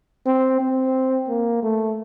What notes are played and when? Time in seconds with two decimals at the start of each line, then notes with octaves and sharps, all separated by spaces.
0.26 C4
0.60 C4
1.29 A#3
1.63 A3